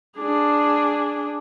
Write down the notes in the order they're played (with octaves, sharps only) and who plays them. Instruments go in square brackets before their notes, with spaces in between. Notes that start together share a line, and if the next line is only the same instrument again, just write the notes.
[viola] D4 G#4